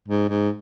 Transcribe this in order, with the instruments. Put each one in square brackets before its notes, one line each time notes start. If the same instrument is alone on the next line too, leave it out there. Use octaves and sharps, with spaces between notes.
[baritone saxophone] G#2
G#2